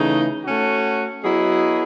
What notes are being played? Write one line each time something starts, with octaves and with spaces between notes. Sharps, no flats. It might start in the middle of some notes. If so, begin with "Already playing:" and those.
Already playing: C#3 E3 A3 D#4
A3 C#4 F#4
F#3 B3 E4 G#4 D#5